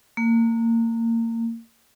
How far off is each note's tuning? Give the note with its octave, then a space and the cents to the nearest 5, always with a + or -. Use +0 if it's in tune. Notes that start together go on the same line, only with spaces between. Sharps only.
A#3 -30